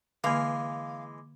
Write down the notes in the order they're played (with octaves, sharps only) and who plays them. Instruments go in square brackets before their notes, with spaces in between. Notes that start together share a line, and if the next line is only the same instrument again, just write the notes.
[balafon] D3 A#3 [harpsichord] E3 G#3 [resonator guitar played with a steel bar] F5 [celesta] D6